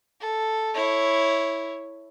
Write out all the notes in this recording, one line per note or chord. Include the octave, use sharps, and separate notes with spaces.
A4
E4 C#5